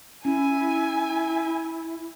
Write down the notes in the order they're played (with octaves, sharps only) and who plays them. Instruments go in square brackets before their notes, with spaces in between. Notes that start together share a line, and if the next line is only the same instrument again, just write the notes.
[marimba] C#4 [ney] E4 [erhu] G#5